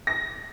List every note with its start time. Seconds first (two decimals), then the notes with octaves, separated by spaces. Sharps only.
0.07 A#6